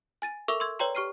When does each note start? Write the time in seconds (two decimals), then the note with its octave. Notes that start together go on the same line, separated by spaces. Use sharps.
0.22 G#5 A6 D#7
0.48 A4 A#4 E5 C#6 D6 E6
0.60 C6 C#6 E6 G#6
0.79 B4 C#5 D5 G5 A#5 C6
0.95 G4 C#6 F6 C7 D#7